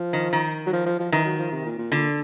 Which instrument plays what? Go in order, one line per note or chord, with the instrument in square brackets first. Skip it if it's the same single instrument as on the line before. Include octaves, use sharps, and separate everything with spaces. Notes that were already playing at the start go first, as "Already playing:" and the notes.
Already playing: [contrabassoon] F3
[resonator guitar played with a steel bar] D#3
D#3
[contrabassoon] F#3
F3
F3
F3
[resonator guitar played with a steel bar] D#3 [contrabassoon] E3
[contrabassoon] F#3
F3
C3
A#2
A#2
[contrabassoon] A#2 [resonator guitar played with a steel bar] D3